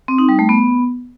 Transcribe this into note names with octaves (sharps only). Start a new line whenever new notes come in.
C4
D#4
G3
A3
B3